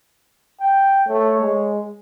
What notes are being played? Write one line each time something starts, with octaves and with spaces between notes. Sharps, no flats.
G5
A3 C#5
G#3